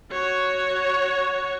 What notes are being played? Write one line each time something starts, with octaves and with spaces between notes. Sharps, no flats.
F#4 C#5